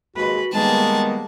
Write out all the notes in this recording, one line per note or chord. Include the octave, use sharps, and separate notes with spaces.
D#2 G#3 F#4 B4
D#3 G3 G#3 A#3 B3 G#4 A5